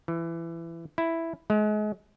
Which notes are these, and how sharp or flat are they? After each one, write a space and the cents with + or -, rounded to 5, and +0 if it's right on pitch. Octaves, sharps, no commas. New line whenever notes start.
E3 +20
E4 +0
G#3 +35